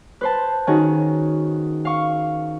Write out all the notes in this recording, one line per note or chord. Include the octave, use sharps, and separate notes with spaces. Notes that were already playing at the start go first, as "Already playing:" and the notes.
B4 C5 A5
D#3 C#4 D#4 F#4 G#4
F5 C#6